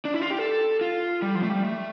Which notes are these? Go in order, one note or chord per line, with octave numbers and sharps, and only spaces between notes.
D4
E4
F4
G4
A4
F4
G3
F3
A3
G3
A3